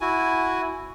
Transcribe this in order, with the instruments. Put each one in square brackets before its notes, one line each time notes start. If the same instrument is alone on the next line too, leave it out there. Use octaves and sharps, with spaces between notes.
[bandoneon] E4 G#5 [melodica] F#4